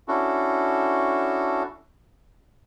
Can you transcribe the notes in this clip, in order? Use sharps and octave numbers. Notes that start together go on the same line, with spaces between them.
C#4 D4 E4 F#4 A4